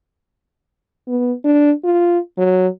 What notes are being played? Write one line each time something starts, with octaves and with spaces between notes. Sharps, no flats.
B3
D4
F4
F#3